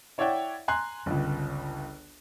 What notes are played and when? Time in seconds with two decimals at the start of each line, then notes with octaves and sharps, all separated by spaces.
0.18 E4 C#5 D5 E5 F#5 G5
0.68 G#5 A#5 C6 F#6
1.06 G1 C#2